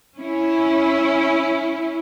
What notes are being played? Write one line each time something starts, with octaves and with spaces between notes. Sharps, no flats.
C#4 E4